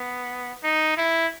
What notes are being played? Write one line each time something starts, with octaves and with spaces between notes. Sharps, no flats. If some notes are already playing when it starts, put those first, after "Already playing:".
Already playing: B3
D#4
E4